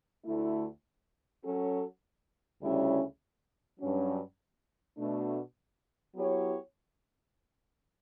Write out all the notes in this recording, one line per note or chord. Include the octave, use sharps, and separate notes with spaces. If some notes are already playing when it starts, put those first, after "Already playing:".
D2 D3 A3 E4
F#3 C#4 F#4 A4
D2 C#3 G3 C#4 E4
G2 F#3 C#4
B2 A3 D4
F#3 B3 E4 G4 C#5